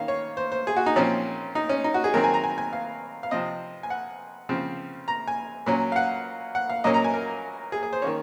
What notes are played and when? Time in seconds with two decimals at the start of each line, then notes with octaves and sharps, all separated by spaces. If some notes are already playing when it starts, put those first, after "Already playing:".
Already playing: D#3 A#3 C#4 F5
0.08 C#5
0.37 C5
0.52 C5
0.67 G#4
0.76 F#4
0.86 D#4
0.96 A#2 F3 C4 C#4
1.55 D#4
1.69 C#4
1.84 D#4
1.94 F#4
2.04 G#4
2.14 D#3 F#3 C4 A#4
2.24 G#5
2.34 A#5
2.44 G#5
2.58 G#5
2.73 F5
3.23 F5
3.31 C3 F3 C4 D#5
3.83 G#5
3.90 F#5
4.49 C#3 F3 C4
5.08 A#5
5.28 G#5
5.66 A#2 F#3 C#4
5.92 F5
5.96 F#5
6.55 F#5
6.70 F5
6.84 A#2 F#3 A#3 C#4 D#5
6.94 A#5
7.04 G#5
7.14 A#4
7.72 G#4
7.83 G#4
7.93 C5
8.02 D#3 A#3 C#4 C#5